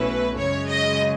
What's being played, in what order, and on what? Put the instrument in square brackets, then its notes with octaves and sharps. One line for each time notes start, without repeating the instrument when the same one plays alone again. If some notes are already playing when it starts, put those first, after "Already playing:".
Already playing: [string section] B1 B2 A3 C#4 E4 [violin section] B4
[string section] F#2 C#3 G#3 [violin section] C#5
[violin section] D#5